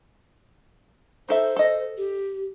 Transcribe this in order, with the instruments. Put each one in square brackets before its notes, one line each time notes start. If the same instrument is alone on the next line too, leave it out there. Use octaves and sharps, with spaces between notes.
[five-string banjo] D#4 A4 E5 [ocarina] C5
[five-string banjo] A4 D#5
[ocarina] G4